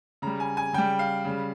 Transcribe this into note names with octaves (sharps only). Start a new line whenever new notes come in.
C#3 G3 A#5
G#5
G#5
C#3 G3 G5
F5
C#3 G3